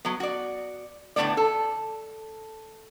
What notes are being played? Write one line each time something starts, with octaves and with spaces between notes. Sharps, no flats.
F#3 B3
F#4 D5
A2 D3 F3 A3 B3 D5
A4